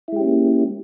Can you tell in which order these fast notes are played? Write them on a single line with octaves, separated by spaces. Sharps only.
E4 G#3 G4 C#4 A#3